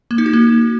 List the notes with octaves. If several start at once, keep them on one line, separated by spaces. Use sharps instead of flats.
A#3
D#4
F#4
A#3